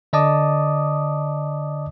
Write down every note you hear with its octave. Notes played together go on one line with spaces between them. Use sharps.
D3 D5 D#5 A5 D6 D#6